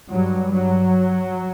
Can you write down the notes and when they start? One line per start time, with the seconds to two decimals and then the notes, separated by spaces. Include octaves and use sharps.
0.11 G2 F#3
0.52 F#3